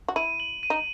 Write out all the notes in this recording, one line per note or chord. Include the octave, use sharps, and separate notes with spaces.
F#4
E4 D#7
F#7
D#7
D#4